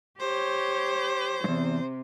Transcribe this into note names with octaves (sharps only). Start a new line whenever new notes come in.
G4 C5 C#5
E2 G2 C3